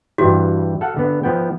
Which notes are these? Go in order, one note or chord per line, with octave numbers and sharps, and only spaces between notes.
G2 E3 G3 F#4
A4 F5 F#5
D3 B3
F3 B3 G5